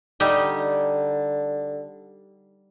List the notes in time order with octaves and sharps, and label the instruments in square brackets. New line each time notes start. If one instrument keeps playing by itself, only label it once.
[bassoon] D3 [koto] G3 D#4 G4